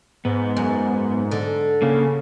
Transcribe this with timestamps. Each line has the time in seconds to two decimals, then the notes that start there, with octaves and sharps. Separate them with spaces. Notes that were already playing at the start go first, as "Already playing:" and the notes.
0.25 G#2 B3
0.57 F#2
1.31 D3
1.82 C#3 A#3 C#4